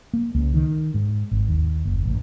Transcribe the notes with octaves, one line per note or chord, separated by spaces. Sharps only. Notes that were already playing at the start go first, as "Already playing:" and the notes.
A#3
C#2
D#3
G#2
G#1
D#2
F#1
A1